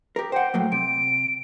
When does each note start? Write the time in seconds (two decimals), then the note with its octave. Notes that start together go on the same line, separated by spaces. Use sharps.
0.16 G4 A#4
0.32 C5 F#5 G5
0.54 A2 F#3 A#3
0.72 C3 D7